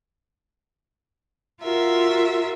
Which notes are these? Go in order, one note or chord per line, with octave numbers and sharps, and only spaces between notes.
F4 F#4 A#4 E5